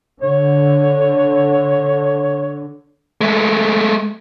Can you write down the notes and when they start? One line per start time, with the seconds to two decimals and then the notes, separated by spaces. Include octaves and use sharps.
0.22 D3 C#5
3.21 G#3 A3